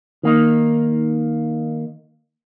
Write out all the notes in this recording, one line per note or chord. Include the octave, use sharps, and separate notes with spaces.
D#3 A#3 D#4